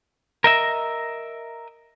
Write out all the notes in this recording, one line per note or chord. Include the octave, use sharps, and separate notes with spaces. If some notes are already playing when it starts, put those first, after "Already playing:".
A#4 D#5 E5